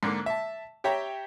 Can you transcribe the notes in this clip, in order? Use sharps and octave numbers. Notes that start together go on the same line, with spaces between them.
G#2 D3 A#3
E5 A5
G4 C#5 E5 G5 A#5